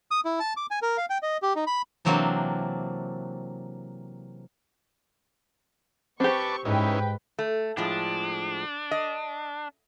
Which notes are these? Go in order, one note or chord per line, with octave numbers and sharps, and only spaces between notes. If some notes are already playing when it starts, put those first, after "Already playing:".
D#6
E4
A5
D6
G#5
A#4
F5
G5
D#5
G4
D#4
B5
C3 E3 F#3 A#3 C4 D4
C4 G4 B4 A5 C#6 D6
G#2 C#4 D#4 E4 B4 G5
A3
A2 F3 G#3 D4
D#5